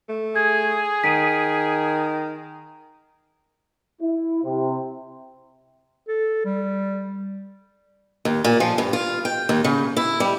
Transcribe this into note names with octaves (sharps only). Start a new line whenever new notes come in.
A3
G#4 G#6
D#3 B6 D7 D#7
E4
C3
A4
G3
D#2
A#2
F3
G2
F4
G5
D#2
C#3
E4
G3